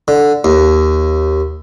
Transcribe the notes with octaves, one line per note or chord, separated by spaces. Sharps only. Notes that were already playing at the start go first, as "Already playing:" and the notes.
D3
D#2